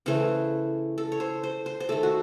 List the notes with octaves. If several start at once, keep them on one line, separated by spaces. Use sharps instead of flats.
C#3 E3 A3 C5
A4
C#5
C5
C5
C5
C5
D#3 A3 A4
F#4